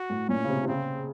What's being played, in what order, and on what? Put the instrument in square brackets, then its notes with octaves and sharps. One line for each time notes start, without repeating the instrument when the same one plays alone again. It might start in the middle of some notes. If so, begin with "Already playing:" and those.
Already playing: [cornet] F#4
[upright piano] A2
[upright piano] A#2 [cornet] C#4
[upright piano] C#3
C3
C3
[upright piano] C#3 [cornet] C4